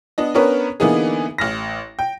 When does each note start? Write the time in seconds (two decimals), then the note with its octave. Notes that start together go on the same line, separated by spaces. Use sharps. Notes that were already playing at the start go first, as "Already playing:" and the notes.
0.18 B3 D4 D#5
0.35 B3 C#4 D4 A#4 B4 C#5
0.80 D3 E3 A#3 B3 D#4 G#4
1.38 A1 F6 A#6
1.99 G5